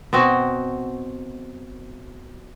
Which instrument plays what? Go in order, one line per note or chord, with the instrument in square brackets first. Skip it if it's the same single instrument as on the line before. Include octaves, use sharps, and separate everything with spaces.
[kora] B2 C4 F#4